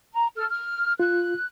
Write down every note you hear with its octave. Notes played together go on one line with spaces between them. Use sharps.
A#5
A4 F6
F6
F4 F#6